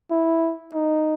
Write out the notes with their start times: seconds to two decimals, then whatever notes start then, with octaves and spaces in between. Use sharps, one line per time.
0.11 E4
0.74 D#4